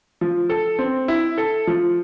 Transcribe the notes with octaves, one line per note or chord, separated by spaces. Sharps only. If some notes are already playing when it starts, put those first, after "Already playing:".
F3
A4
C4
E4
A4
F3